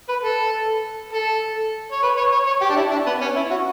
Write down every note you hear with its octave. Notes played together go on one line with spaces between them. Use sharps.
B4
A4
A4
C#5
B4
C#5
C#5
C#5
G4
D4
E4
D4
B3
C#4
E4
F#4